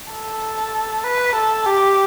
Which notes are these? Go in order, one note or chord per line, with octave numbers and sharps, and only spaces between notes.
A4
B4
A4
G4